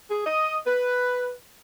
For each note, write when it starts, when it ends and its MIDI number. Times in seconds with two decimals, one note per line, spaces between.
0.11 0.26 68
0.26 0.57 75
0.66 1.33 71